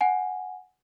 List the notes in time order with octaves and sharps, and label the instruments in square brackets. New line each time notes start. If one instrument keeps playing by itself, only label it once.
[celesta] F#5 G#5